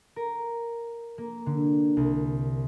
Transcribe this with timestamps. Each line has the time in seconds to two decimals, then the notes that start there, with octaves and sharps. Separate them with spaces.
0.16 A#4
1.18 A#3
1.46 D3
1.97 C2